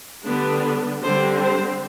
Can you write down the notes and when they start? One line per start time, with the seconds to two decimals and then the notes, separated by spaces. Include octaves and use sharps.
0.25 D3 G3 B3 D4
1.03 D3 G3 C4 C5
1.42 C5